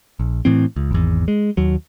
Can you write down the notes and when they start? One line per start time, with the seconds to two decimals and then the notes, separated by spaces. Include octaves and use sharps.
0.19 A#1
0.45 A2 E3 C4
0.76 C#2
0.91 G#1 E2
1.28 G#3
1.57 D#2 F#3